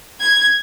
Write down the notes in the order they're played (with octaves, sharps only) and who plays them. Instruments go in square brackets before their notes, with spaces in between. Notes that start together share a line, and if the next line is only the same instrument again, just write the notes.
[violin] G#6